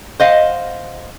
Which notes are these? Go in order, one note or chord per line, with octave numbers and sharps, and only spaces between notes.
C5 D#5 F5 F#5